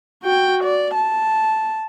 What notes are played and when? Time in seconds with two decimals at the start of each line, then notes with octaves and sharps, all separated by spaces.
0.23 F#4 G5
0.64 D5
0.95 A5